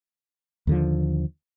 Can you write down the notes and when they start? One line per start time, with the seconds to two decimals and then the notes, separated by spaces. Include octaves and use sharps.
0.67 D#2 D3 F3